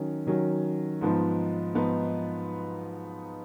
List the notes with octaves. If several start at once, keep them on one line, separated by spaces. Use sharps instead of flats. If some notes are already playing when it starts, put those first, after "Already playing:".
Already playing: D#3 F#3 C#4
D#3 F#3 C#4
G#2 F3 B3 D#4
G#2 F3 B3 D#4